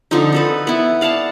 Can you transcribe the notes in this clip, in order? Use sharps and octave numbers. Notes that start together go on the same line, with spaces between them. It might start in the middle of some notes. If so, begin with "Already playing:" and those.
D3 F3 C4 D#4
D#4 A4 B4
B3 E4
D5 F5 F#5 A5